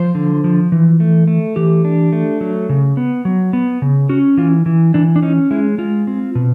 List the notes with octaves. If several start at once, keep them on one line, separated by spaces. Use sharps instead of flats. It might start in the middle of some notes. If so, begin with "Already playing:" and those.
Already playing: F3 C5
D3
F3
E3
A3
A3
E3 G4
D4
A3
F#3
C#3
B3
F#3
B3
C#3
C#4 F#4
E3 F4
E3
E3 D4
D4
C#4 D#4
G#3 E4
G#3 F4
C4
B2